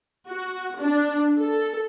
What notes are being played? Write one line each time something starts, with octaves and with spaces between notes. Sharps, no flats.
F#4
D4
A4